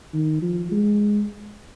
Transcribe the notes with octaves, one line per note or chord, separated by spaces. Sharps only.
D#3
F3
G#3